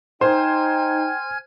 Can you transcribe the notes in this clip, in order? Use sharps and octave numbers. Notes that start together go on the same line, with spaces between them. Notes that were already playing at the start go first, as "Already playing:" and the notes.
D#4 C5 G5 G#5 F6 G#6